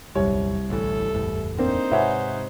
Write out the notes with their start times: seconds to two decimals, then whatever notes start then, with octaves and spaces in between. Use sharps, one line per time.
0.15 D#1 C2 F#2 C#5
0.70 A1 D2 E3 A4
1.14 F#1 E2 A2
1.58 A#3 C4 D4 D#4 C5
1.92 G#2 C3 B4 C#5 E5 F#5 G#5